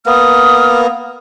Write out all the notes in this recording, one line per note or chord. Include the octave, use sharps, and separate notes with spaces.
A#3 B3 D#6 F6